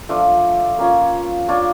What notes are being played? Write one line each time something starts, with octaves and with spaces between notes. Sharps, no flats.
F3 A3 D4 F4
A#3 C#4 F4 C#5
D4 F4 C#5